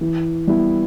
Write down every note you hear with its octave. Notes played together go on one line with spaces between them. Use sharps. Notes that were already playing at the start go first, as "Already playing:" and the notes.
E3
G3 B3 E4